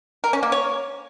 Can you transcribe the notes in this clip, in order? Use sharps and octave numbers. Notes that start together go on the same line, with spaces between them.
A#4
C#4
A#3
C#5